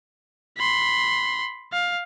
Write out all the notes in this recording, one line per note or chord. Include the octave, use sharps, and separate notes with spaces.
B5 C6
F5